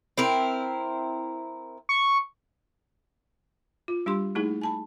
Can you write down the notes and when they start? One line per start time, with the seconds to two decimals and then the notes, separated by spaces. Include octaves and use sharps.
0.18 C4 E4 A#4
1.89 C#6
3.88 F4
4.06 G3 D4 G4 C6
4.35 A3 A#3 D#4 E4 G#4
4.61 G#5 A5 B5